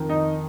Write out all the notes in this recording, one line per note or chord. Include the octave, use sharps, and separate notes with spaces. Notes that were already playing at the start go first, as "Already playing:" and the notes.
Already playing: F2 D#3
D#4